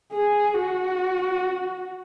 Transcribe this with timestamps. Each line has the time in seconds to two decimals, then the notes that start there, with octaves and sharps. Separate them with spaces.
0.12 G#4
0.54 F#4